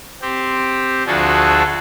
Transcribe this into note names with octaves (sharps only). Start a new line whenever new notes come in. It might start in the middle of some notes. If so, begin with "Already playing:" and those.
C4 G4
D2 F3 D4 F#4 G#4 A4